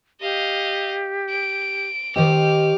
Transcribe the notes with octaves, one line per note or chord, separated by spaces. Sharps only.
G4 D#5 F5
D7
D#3 G4 C5 D#5 D6 F6